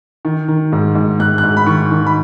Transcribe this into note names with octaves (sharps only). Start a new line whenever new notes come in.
D#3
D#3
G#2
G#2
G#2 F#6
F#6
G#2
B5
D#3 C#6
D#3
B5